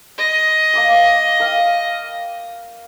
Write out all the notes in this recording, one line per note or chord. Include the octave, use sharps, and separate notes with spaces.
D#5
A#3 D6 D#6
A#4 F5 G5